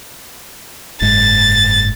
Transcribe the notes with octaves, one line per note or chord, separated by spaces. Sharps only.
F#1 G#2 G#3 A6